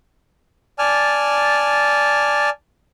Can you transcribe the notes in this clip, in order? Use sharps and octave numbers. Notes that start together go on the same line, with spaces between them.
D5 G#5 A5 F6